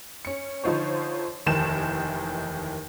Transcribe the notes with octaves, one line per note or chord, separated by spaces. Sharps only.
C#4 C#7
D3 F3 D#4 F4 C5 C#5
F1 D#2 D#3 E3 A5 E7